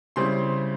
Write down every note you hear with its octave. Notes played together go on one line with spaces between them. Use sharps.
C#3 G3 C4 E4 C6